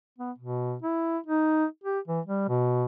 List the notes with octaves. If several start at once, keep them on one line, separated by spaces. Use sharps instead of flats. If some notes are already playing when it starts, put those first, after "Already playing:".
B3
B2
E4
D#4
G4
E3
G3
B2